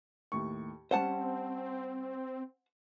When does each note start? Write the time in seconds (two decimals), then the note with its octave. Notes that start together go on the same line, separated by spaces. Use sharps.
0.32 D#2 A2 C#6
0.91 G3 C4 C#4 C5 F#5 A5